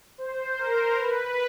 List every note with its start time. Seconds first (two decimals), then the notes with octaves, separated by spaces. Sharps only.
0.18 C5
0.58 A#4
0.99 B4